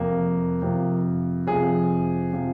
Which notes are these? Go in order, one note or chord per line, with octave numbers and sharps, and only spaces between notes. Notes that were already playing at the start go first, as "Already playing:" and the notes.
Already playing: F2 C3 F3 A#3
F2 C3 F3
F2 C3 F3 G#4
C3 F3